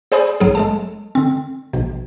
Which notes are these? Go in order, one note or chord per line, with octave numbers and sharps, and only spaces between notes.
G#4 C5 D5 G#5 B5 D#6
A#1 G#2 F#3 G#4
G#3 A4 A5
D3 C4
A#1 B2